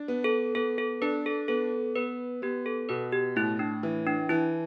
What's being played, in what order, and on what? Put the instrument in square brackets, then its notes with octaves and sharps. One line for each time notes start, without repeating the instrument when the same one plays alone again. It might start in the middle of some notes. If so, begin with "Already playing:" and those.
Already playing: [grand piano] D4
B3
[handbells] A4
[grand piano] B3 [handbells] A4
[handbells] A4
[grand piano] D4 [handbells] B4
[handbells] A4
[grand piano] B3 [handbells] A4
[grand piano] B3 [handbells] B4
[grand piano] B3 [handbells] G4
[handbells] A4
[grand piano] B2 [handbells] B4
[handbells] G4
[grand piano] A2 [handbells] E4
[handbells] D4
[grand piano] E3
[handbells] D4
[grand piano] E3 [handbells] E4